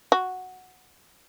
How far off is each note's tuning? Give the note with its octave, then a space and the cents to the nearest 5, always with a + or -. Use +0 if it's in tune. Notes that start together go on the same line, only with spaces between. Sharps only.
F#4 -5